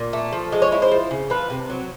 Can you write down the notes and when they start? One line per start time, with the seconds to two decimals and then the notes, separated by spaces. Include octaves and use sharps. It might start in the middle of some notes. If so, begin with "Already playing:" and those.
Already playing: A#2
0.13 A3
0.33 F3
0.52 G#3
0.62 C#5
0.72 E4 C#5
0.82 C5
0.92 F3
1.11 C#3
1.30 F3 B4
1.50 C3
1.70 F#3